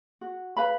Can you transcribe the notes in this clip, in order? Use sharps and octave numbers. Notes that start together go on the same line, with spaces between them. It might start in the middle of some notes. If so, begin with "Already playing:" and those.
F#4
B4 F5 B5